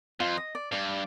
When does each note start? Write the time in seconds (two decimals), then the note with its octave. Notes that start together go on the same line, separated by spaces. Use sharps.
0.20 F2 F4
0.37 D#5
0.55 D5
0.72 G2 D5